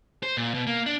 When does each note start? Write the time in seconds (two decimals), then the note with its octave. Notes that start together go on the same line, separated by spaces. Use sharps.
0.23 C5
0.37 A#2
0.54 B2
0.67 A#3
0.86 D4